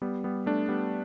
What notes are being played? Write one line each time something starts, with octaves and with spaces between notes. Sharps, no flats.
G3 B3
G3 B3
A3 D4
G3 B3